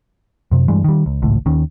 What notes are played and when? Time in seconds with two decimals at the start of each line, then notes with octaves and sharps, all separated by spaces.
0.52 F#2 C3
0.68 G2 E3 G#3
0.84 D#3 G3
1.06 C#2
1.22 G#1 C#2 A2
1.46 D#2 D#3 C#4